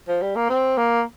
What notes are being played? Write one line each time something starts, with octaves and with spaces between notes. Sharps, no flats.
F3
G3
A#3
C4
A#3